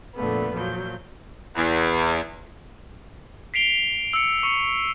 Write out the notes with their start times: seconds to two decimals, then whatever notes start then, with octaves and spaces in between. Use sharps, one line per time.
0.15 F2 A#2 D3 A3 B3
0.54 A#2 F3 F#3 G6
1.56 E2
3.54 B6 C7 D7 F7 G7
4.13 E6 C#7
4.43 C#6 C#7